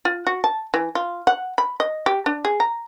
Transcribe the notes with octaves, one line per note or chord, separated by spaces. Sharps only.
F4
F#4
A5
E3
F4
F#5
B5
D#5
G4
D4
G#4
A#5